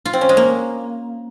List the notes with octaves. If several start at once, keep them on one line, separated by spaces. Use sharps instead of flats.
F4
C4
C#4
G#3
A#3